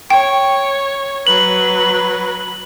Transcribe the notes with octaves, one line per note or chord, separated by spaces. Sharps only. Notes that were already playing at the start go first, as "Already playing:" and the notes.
C#5 G5
F#3 B4 F#7